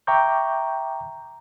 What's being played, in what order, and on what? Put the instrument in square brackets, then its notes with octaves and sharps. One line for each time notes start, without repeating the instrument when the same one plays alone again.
[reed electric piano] E5 G5 A#5 C#6 D6 G6